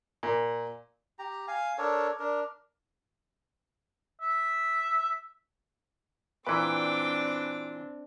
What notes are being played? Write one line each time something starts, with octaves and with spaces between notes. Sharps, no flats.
A#2
G4 A#5
F5 G#5
D4 A4 A#4 C#5
D4 A#4
E5
A#2 E3 C4 D4 B4 G5 D6